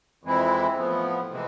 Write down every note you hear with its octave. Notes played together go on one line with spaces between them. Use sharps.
F2 E3 G#3 C4 E4
A2 F3 B3
C3 E3 G#3 C4